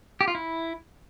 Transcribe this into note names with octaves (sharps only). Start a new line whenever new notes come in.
G4
F4
E4